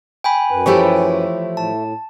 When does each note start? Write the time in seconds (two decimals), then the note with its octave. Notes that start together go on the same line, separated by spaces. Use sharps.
0.24 G5 G#5 B5
0.51 F#2 B4
0.66 E3 F3 A3 E4 G4 C#5
1.57 A2 A5